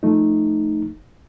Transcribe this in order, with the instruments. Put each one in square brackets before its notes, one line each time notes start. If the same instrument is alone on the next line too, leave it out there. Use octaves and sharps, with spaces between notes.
[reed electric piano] F3 A3 D#4